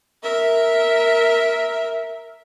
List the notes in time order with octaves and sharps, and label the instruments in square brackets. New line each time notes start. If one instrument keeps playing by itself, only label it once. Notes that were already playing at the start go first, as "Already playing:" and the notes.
[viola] A#4 E5